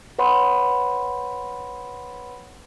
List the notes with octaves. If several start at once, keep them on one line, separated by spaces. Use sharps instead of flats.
B4 C#5 F#5 B5 C6